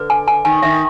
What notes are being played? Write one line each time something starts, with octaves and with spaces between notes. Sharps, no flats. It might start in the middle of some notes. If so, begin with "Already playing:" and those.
Already playing: D3 B4
G#5
G#5
D#3 G#5
D#3 E5